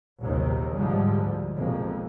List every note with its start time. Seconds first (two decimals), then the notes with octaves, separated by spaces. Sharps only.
0.20 A#1 D#2 C3 D#3 F#3
0.75 G#2 D3 F3 G3 G#3
1.23 D2
1.56 B1 F2 C3 G#3 A#3